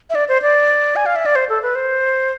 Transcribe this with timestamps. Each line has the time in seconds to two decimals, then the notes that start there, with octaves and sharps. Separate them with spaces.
0.10 E5
0.15 D5
0.29 C5
0.42 D5
0.96 G#5
1.06 F5
1.16 E5
1.26 D5
1.36 C5
1.49 A4
1.62 B4
1.75 C5